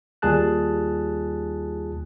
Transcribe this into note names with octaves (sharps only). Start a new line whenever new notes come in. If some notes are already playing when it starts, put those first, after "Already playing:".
D#2 G3 F4 G#4 A5 F#6